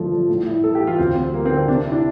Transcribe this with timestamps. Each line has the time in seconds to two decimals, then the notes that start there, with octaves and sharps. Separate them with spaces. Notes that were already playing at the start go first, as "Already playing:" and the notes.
Already playing: G1 F3 A3
0.11 G2
0.29 A2
0.46 E4
0.63 A3 A4
0.75 G4
0.81 E3
0.87 F4
0.98 D2 C4
1.16 C4
1.34 G3 A#3
1.46 C4
1.51 D3
1.57 C4
1.68 C3 D4
1.86 E4
1.92 D4